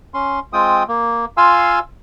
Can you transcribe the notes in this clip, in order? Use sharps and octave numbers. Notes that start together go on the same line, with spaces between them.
C#4 C6
G#3 C4 F4 G5 D#6
A#3
F4 F5 G#5 C6 E6